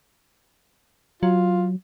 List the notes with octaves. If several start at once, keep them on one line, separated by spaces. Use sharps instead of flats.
F#3 F4